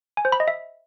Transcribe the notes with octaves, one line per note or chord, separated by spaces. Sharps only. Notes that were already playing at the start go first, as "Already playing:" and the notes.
G#5
C5
B5
D#5
E5